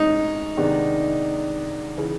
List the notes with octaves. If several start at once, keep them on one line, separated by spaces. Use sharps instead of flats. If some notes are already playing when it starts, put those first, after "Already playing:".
Already playing: G#2 G#3 C#4 D#4
C3 D#3 G#3 B3 D4
C#3 E3